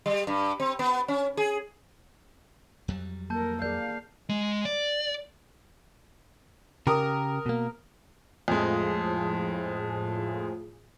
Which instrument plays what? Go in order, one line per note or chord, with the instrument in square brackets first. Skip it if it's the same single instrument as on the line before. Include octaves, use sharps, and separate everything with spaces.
[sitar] G3
G2
C4
B3
C#4
G#4
[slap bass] F2 F#3 G3
[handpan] A#3 [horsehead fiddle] A4 A#4 [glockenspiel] A5 G6
[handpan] G#4 A#4 D5 [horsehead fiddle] F5 [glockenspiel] G6
[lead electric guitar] G#3
D5
[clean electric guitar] C#3 G4 [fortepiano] A#4 D#6
[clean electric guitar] B2 A#3
[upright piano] F2 G#3 [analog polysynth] A2 F3 G#4